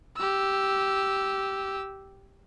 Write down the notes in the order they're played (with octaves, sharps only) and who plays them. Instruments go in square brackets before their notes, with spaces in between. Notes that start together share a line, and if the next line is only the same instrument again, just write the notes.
[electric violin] G4 E6